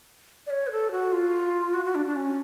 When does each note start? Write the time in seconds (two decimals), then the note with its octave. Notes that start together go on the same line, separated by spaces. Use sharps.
0.46 D5
0.50 C#5
0.67 B4
0.71 A4
0.91 F#4
1.12 F4
1.74 F#4
1.85 F#4
1.95 D4
2.06 D4
2.16 C#4